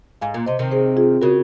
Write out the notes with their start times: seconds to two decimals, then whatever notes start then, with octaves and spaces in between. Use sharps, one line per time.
0.22 G#2 F5 G#5
0.34 A#2
0.46 C3 C5 D#5
0.59 C3 D#3
0.71 G#4 C5
0.97 F4 G#4
1.21 C#3 F#4 A#4